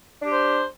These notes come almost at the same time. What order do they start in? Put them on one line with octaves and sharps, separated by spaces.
D4 G4 C5